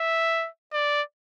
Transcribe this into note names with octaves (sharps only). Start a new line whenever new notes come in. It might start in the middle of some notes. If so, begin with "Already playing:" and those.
Already playing: E5
D5